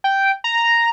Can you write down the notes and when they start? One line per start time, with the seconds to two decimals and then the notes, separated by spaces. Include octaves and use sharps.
0.04 G5
0.44 A#5